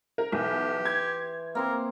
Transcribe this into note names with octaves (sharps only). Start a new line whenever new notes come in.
A#4
B1 E3 G4
C6 G#6
A#3 C4 A#4 C5